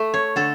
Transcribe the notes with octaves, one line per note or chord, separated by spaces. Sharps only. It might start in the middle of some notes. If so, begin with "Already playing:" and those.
Already playing: A3
C#5
D3 A4